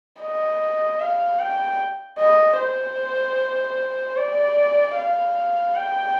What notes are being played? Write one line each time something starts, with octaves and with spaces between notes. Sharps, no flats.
D#5
F5
G5
D#5
C5
D5
F5
G5